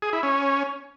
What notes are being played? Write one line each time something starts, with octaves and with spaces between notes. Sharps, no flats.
G#4
E4
C#4